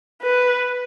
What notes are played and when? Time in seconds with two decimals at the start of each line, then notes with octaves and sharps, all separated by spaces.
0.22 B4